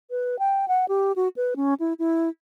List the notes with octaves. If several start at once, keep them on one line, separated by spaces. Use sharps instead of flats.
B4
G5
F#5
G4
F#4
B4
C#4
E4
E4